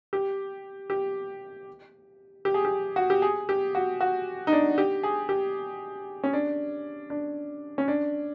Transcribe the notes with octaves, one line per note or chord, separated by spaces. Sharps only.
G4
G4
G4
G#4
G4
F#4
G4
G#4
G4
F#4
F#4
D#4
D4
G4
G#4
G4
C#4
D4
D4
C#4
D4